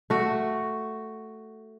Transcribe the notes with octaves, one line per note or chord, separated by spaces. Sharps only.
A3 F#4